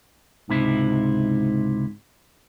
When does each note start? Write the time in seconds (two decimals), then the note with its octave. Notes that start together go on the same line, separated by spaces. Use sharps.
0.49 C#2 G#2 C3 E4